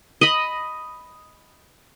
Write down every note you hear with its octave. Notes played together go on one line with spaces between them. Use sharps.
D#5 B5